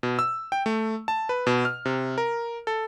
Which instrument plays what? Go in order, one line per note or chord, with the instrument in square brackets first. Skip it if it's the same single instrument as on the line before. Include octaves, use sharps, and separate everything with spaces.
[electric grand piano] B2
E6
G5
A3
A5
B4
B2
F6
C3
A#4
A4